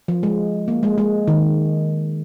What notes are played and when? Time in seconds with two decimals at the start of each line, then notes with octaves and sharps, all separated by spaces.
0.08 F3
0.23 G#3
0.68 A#3
0.83 G#3
0.98 G#3
1.28 D#3